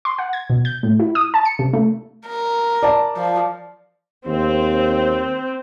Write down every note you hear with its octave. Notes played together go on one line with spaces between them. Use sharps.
C6
F#5
G#6
B2
G6
A2
E4
D#6
A5
C#7
C3
A3
A#4
D5 A5
F3
D#2 C4